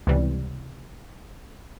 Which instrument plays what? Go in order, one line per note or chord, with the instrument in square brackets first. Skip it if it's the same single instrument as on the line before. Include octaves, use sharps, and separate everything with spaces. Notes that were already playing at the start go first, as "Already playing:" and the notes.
[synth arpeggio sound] C#2 C3 E3 G3